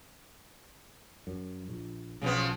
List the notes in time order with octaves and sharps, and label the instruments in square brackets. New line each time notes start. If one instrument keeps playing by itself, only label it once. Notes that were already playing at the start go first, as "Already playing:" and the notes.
[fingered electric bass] F#2
A#1
[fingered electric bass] B1 [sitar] C#3 F3 B3